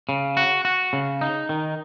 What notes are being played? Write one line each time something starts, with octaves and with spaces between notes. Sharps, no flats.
C#3
F#4
F#4
C#3
D#4
D#3